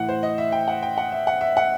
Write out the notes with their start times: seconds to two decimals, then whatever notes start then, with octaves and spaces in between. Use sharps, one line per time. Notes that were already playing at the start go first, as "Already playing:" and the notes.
Already playing: A2 E3 F#5
0.09 C5
0.23 D#5
0.38 E5
0.52 G5
0.68 F#5
0.83 G5
0.98 F#5
1.12 E5
1.27 F#5
1.41 E5
1.57 F#5